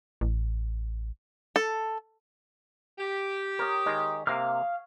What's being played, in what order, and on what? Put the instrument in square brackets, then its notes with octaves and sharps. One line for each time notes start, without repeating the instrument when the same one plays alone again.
[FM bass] A1
[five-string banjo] A4
[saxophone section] G4
[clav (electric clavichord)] A#4 [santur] C#5 D#6
[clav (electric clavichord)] D#3 G#3 [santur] D#6
[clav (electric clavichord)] C3 A#3 [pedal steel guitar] F5 F6